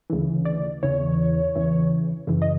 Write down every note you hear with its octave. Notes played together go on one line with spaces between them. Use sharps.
D2 C#3 E3
D5
E2 C#3 E3 C#5
E2 C#3 E3
F#2 C#3 E3
D#5